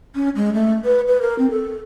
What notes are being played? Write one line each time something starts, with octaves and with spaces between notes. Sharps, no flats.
C#4
G#3
A3
B4
B4
A#4
C4
A4